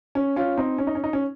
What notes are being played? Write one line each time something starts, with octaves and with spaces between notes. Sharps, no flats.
C#4
C#4 F4
C4 D#4
C#4
D#4
C#4
D#4
C#4